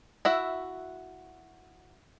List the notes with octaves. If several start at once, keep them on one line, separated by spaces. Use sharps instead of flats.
E4 F#4 E5